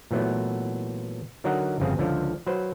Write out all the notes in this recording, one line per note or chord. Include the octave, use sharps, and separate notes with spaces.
A#2 E3 F#3 A3 B3
D3 F#3 D#4 A#4 D#5 F#5
G1 F2 C#3 C4 G#4
C#2 D3 F3 A4
F#3 B4 C5